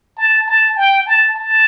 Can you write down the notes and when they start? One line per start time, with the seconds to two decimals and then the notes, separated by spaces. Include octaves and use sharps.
0.18 A5
0.48 A5
0.77 G5
1.07 A5
1.36 A5